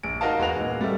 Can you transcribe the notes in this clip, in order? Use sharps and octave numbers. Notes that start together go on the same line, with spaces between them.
A#1 D7
D#4 F#4 A#4 D#5 F5 A5
E1 G#3 F#4 B4 F7
A#2
G3 A3